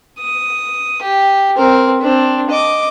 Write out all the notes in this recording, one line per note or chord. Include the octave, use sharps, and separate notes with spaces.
D#6
G4
C4 A#4
C4 D4
D#5 D6